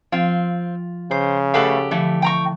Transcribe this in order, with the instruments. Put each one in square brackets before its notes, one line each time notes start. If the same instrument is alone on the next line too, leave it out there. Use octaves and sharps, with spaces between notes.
[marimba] F3 [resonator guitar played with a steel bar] C4 [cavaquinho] F4
[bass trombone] C#3 [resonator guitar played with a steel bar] C5
[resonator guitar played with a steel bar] A3 B4 F5 [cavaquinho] G4 A4 F#5
[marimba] D3 F3 [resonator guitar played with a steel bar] E3 A3 E4
[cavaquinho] G5 A#5 C#6